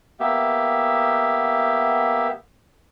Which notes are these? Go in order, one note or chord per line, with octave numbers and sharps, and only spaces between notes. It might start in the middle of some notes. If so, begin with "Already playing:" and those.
A#3 B3 G4 E5